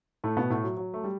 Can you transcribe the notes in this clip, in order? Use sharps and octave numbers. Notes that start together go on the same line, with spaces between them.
A2 A3
B2 B3
A2 A3
F#3
F#3
A3
G3